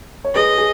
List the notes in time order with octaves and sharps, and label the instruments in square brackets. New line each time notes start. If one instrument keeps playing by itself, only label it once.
[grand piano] C#5
[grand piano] G#4 B4 [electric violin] D#5
[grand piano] G#4